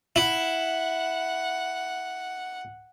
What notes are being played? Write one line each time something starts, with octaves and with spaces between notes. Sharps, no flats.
E4 F#5